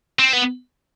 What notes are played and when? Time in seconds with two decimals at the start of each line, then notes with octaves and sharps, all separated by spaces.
0.19 C4
0.33 B3